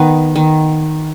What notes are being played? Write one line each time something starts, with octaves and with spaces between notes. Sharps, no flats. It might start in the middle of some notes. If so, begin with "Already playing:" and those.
Already playing: D#3 B3
D#3